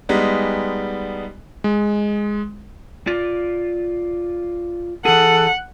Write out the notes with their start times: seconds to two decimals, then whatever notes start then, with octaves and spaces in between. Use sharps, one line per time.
0.09 G3 G#3 B3 D#4
1.64 G#3
3.07 F4 D5
5.05 E3 G#4 A4 F#5